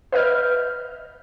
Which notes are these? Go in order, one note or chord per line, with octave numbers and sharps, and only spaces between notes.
B4 D#5 E5 F6 G6